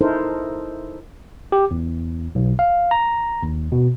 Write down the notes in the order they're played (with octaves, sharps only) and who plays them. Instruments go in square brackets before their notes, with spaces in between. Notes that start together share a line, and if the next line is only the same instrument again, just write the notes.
[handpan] D#4 E4 A4 A#4 C5
[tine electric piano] G4
E2
B1
F5
A#5
D#2
B2